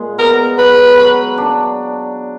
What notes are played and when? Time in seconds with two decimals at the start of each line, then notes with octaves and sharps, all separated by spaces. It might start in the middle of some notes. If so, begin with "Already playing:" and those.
Already playing: A#2 G#3
0.18 B3 A#4
0.57 F#3 B4
0.97 F#3
1.38 D4